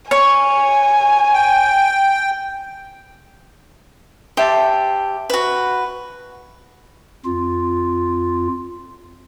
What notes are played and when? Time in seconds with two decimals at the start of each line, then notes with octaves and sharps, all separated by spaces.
0.11 C#5 G#5
1.33 G5
4.37 G4 C5 E5 A5
5.30 F#4 B4
7.25 F2 F4